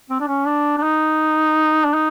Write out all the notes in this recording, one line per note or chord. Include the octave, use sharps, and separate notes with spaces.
C4
D4
C#4
D4
D4
D#4
D4
D#4